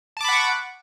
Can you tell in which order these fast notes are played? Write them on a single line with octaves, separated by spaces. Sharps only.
A5 D6 B5 F#5 C#6